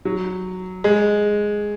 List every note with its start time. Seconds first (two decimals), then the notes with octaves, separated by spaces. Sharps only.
0.05 F#3
0.84 G#3